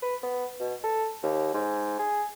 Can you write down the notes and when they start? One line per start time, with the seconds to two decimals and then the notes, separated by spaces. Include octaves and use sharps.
0.03 B4
0.23 B3
0.60 B2
0.84 A4
1.23 D#2
1.54 G#2
1.99 G#4